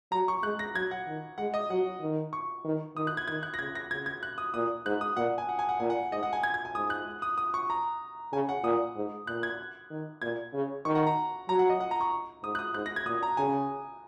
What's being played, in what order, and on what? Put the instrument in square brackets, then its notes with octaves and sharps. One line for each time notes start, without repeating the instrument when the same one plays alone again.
[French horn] F#3 [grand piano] A#5
[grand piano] C#6
[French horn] G#3 [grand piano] F#6
[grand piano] A#6
[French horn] F#3 [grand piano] G#6
[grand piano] F#5
[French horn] D#3
[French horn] G#3 [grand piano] F#5
[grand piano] D#5
[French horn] F#3 [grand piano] F#5
[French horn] D#3
[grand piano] C#6
[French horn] D#3
[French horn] D#3 [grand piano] D#6
[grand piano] F#6
G#6
[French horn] D#3 [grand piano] G#6
[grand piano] F#6
A#6
[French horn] C#3 [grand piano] G#6
[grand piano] A#6
[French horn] C#3 [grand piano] G#6
[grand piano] G#6
F#6
D#6
[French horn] A#2 [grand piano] D#6
[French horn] G#2 [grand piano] F#6
[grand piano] D#6
[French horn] A#2 [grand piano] F#5
[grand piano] G#5
F#5
G#5
F#5
[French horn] A#2 [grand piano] G#5
[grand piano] F#5
[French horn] G#2 [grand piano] D#5
[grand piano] F#5
G#5
G#6
G#6
G#5
[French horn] G#2 [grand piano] D#6
[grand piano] F#6
D#6
D#6
C#6
A#5
[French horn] C#3 [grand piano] G#5
[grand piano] F#5
[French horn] A#2 [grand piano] D#6
[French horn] G#2
[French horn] A#2 [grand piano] F#6
[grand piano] G#6
[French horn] D#3
[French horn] A#2 [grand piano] G#6
[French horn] C#3
[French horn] D#3 [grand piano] C#6
[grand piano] F#5
A#5
[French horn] F#3 [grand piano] A#5
[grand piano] F#5
D#5
F#5
A#5
C#6
[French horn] G#2 [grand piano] D#6
[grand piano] F#6
D#6
[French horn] G#2 [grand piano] F#6
[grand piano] A#6
G#6
[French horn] A#2 [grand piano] D#6
[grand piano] A#5
[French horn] C#3 [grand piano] G#5